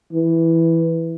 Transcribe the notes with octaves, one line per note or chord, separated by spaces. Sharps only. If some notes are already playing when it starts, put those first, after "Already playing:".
E3